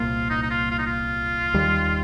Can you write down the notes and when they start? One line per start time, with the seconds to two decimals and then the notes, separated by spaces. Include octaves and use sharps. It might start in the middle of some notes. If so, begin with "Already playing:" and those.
Already playing: C2 A#2 A#3 F4
0.30 D#4
0.43 D#4
0.50 F4
0.71 F4
0.79 D#4
0.87 F4
1.54 D#2 D#3 G3